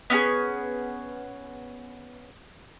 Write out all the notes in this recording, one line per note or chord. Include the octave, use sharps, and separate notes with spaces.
B3 C#4 F#4 G#4